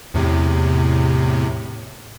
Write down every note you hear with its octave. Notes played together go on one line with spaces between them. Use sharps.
E2 A2 C3